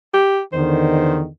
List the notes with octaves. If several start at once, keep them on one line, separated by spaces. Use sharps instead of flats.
G4
E2 D3 D#3 C5